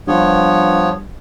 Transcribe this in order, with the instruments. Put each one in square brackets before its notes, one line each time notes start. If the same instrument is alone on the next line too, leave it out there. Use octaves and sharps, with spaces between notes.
[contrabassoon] G2 [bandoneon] F3 B3 C#5